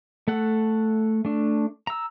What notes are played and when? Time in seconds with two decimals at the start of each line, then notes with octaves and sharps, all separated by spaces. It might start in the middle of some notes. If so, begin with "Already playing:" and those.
0.28 A3 A4 F#5
1.25 A3 D4
1.87 A#5 E6